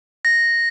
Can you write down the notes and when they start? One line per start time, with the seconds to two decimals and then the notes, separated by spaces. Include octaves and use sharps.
0.25 A#6